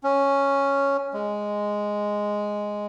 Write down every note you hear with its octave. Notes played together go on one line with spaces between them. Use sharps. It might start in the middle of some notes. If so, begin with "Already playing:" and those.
C#4
G#3